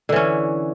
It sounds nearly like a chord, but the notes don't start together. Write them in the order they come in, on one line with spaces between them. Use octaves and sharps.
D3 E3 C#4